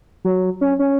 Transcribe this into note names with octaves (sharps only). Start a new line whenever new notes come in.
F#3
C#4
C#4